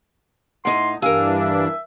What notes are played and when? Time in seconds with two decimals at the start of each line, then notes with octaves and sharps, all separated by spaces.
0.65 A2 D#4 F#5 C6
1.02 G2 E3 D4 G4 A#4 F5 G#5 E6
1.41 E5